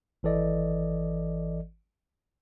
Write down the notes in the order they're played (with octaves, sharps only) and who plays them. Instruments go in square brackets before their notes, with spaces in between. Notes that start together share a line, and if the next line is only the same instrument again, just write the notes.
[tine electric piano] G#1 E3 A4 D5 D#5